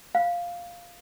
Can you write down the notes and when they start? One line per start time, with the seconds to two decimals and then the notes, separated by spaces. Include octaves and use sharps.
0.15 F5